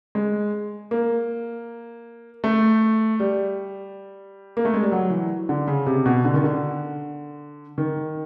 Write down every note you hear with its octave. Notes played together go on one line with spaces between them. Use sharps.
G#3
A#3
A3
G3
A#3
A3
G#3
G3
F#3
E3
D3
C#3
C3
B2
D3
D#3
D3
D#3